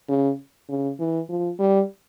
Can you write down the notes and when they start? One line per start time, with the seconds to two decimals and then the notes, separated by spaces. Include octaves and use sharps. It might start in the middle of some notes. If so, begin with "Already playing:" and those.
0.09 C#3
0.69 C#3
1.00 E3
1.29 F3
1.59 G3